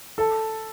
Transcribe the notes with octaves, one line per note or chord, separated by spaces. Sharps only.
A4